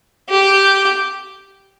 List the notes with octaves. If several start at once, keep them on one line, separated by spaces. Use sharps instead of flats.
G4